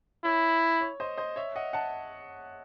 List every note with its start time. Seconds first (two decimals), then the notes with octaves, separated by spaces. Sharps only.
0.24 E4 C#5
0.81 C#5
1.00 C5 D#5
1.17 C5 D#5
1.36 C#5 E5
1.56 D#5 F#5
1.73 F#5 A5